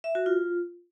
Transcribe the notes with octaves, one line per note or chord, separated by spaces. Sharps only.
E5
F#4
F4